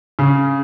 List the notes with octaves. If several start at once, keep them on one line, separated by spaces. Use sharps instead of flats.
C#3